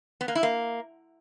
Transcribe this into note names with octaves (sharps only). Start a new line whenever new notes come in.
B3
A#3
E4
A#3